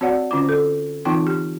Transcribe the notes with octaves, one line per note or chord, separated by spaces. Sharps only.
C4 F#4 C#5 D5 F#5
D3 C#4 F4 D6
A4
E3 C4 D#4 F4 G5
G4